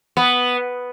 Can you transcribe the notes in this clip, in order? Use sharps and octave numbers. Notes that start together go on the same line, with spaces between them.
B3